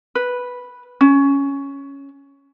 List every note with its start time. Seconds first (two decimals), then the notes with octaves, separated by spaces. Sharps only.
0.15 B4
1.01 C#4